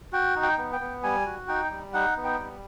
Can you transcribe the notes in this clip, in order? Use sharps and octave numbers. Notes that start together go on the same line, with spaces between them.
F#4 G5
D#4
G5
B3
G5
B3
G3 G#5
F#4
D#4 G5
G3
D#4 F#5
B3
G5
G3